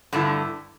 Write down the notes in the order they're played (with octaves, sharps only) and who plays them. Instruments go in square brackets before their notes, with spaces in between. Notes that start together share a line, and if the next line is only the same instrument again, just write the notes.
[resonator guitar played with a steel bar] G2 D3 A3 E4